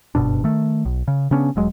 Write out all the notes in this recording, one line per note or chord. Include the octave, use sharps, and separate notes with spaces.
F#1 G2 B2 D4
D#3 A3
B1
C#3
C#3 B3 C#4 D4
E1 F#3 G#3